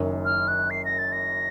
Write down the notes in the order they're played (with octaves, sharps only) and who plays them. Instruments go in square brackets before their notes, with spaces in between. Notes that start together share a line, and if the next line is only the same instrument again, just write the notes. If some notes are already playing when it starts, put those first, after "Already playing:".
Already playing: [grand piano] F#1 F#2 D#3
[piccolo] F6
F#6
C7
A#6
A6
A#6